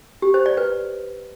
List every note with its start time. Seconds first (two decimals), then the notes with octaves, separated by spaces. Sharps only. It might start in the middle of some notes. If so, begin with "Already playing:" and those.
0.22 G4
0.34 C5
0.46 D5
0.57 B4